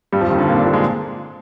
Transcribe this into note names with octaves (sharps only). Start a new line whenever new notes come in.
G2 G3
F2 F3
D#2 D#3
D3
A#2 A#3
D3 D4
A#2 A#3
G#3